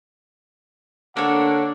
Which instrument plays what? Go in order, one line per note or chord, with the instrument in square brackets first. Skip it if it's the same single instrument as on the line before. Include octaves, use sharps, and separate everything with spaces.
[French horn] D3 [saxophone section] A#3 D4 [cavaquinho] A4 C#5 [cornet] F#5